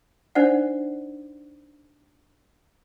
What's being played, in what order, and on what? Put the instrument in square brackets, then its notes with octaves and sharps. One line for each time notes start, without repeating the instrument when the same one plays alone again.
[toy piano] D4 D#4 C5 D5 F#5